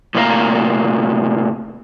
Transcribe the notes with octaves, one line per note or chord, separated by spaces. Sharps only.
A2 C3 A#3 B4 F5 A#5